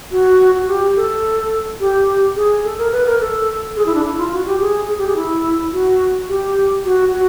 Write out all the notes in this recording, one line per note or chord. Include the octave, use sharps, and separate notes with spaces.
F#4
F#4
G4
A4
G4
G#4
A4
A#4
B4
A#4
A4
G#4
E4
D4
E4
F4
F#4
G4
G#4
G#4
G4
G#4
E4
F#4
G4
F#4
F#4